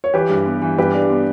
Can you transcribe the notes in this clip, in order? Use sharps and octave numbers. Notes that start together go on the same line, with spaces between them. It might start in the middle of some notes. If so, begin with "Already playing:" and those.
C#5
E3 G4 B4
G2
B3
E3
G2 G4 B4
D4
B3